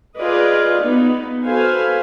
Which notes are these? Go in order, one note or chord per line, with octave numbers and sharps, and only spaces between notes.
F4 G#4 B4 D5 D#5
B3 D#4
F#4 A4 B4 C5 F5 G#5